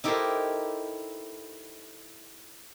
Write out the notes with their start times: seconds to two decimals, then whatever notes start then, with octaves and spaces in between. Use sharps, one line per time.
0.04 D#4 E4 G4 A4 A#4 C5